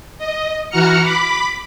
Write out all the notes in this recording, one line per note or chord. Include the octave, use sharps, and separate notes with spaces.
D#5
E3 F#4 F#5 A#5 F6 C#7
B5 D6 B6